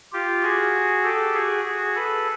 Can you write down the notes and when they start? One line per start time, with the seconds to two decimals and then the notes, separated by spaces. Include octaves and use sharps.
0.13 F4 G4
0.43 F#4 G#4
1.04 G4 A4
1.34 F#4 G#4
1.64 F#4 G#4
1.95 A4 B4